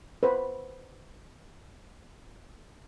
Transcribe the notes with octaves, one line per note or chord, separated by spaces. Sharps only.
B4 C5